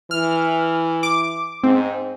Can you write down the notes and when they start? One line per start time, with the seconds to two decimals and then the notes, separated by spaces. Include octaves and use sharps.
0.11 E3 F6
1.03 D6
1.64 G#2 C4